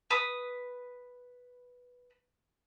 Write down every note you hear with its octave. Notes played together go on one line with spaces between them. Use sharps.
B4 D#6